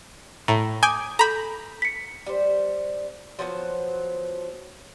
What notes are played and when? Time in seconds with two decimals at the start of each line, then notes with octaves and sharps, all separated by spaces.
0.48 A2 A#5
0.83 G#5 D6 D#6 G6 D7
1.19 A4 A#5 B5 G6
1.82 B6 C#7
2.26 G3 C5
3.39 F3 F#3 B3 C5